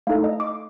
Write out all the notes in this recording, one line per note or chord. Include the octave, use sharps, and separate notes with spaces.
A3 D#4 A4 F5
D#5
D6